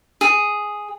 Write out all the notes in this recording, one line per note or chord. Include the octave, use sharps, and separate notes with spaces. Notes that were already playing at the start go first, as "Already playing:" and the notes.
G#4